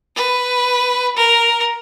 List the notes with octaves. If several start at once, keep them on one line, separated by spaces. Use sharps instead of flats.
B4
A#4